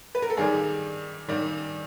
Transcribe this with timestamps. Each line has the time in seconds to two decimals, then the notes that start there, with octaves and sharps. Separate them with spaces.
0.15 B4
0.22 A#4
0.30 A4
0.37 G2 D#3 G3 G#4
1.28 G2 D#3 G3